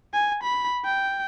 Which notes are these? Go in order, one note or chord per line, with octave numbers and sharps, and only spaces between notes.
G#5
B5
G5